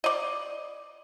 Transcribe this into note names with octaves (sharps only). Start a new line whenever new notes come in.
D5 D#5